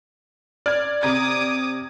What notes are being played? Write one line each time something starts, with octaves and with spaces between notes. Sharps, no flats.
D5 F6 G#6
C3 A#5 D6 D#6 G#6